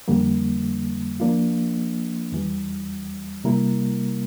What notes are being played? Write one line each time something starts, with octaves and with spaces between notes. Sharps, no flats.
F2 D3 G3 A#3
F3 A#3 D4 F4
E2 E3 G3
C3 G3 A#3 E4 A#4